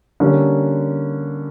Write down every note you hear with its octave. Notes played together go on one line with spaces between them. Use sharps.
D3 G3 A#3 C#4